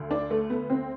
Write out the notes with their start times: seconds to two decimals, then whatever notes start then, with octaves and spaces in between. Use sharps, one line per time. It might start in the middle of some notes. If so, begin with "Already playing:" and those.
Already playing: D2 D3
0.11 D4
0.30 A3
0.50 B3
0.70 C4